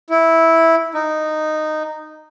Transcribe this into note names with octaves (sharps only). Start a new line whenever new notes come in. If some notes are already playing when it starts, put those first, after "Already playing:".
E4
D#4